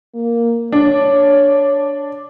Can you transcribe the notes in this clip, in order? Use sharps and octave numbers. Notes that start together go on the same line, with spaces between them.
A#3
D4 C#5